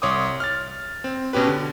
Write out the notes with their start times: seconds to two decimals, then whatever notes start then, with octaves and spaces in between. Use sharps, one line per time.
0.02 C2 C#5 C6 D6 D#6
0.40 F6 A6
1.04 C4
1.33 B2 C#4 G4 B4
1.48 D3